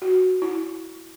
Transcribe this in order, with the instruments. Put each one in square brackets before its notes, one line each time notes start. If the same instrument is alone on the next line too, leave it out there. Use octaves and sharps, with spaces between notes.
[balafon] F#4
E4